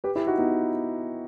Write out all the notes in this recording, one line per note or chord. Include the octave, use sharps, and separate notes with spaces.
G4 B4
E4 G4
D#4 F#4
B3 D#4